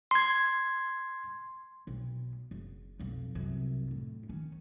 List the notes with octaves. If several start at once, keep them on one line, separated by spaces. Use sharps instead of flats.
C6 G#6
B1
F#1
B1 F2
C2 F#2
A2
D#3 C#4